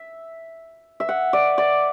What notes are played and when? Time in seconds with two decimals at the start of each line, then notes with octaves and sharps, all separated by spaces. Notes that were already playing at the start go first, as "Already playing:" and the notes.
Already playing: E5
1.00 E5
1.09 F#5
1.33 D5
1.58 D5